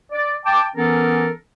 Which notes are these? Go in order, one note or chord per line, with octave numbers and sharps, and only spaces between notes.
D5
G5 A5 D6
E3 B3 C#4 A4 A#4